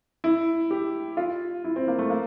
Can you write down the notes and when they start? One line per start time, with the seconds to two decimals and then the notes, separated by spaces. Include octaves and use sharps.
0.24 E4
0.71 G4
1.17 F4
1.64 E4
1.76 C4
1.88 A#3
1.99 A3
2.10 A#3